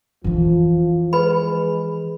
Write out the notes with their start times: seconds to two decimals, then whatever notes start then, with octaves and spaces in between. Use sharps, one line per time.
0.24 F2 E3 F3
1.13 G#3 B4 B5